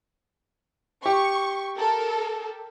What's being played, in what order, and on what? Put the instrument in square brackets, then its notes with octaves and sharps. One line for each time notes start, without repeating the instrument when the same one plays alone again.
[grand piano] G4 [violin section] C#6
[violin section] A4 A#4